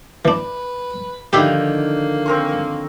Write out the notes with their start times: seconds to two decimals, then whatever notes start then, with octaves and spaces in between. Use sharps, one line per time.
0.25 E3 D4 B4
1.33 D3 D#3 F3 A#3 G4 E5
2.26 C4 A#4 C#6